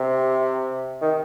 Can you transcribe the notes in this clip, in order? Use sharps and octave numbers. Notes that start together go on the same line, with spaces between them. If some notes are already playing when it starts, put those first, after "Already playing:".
Already playing: C3
D#3